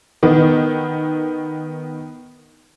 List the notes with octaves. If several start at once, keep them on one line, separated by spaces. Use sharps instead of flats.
D#3 B3